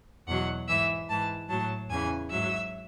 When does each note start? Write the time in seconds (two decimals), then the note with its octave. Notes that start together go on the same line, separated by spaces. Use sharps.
0.27 E2 B2 F#3 F#5
0.68 G#2 E3 E5
1.09 G#2 E3 A5
1.49 A2 F#3 A5
1.89 E2 C#3 E3 G#5
2.30 G#2 F#3 E5